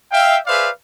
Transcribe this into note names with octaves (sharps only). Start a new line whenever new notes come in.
E5 F5 G5
G#4 B4 C5 D5 E5 F5